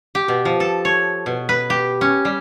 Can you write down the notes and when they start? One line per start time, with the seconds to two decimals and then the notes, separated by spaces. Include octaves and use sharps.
0.15 G4
0.28 B2
0.45 F3
0.60 A4
0.85 C#5
1.26 B2
1.49 B4
1.70 G4
2.01 C#4
2.25 G3